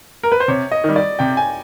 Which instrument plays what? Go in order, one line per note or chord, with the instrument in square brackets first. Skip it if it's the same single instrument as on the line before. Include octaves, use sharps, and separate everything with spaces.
[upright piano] A#4
B4
C5
[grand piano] C3 [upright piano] C#5
[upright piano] D#5
[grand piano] D#3 G3
[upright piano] D5
[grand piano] C3 [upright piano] G5
[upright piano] G#5